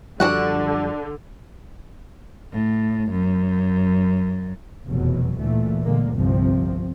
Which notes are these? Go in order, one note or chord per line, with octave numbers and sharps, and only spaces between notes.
F#2 D3 F3 G3 D4 F#4 F#5
A2
F#2
F1 E2 B2 F#3
D2 A#2 E3 A3
A#2 D3 G#3 A#3
G1 C2 C3 F3 C4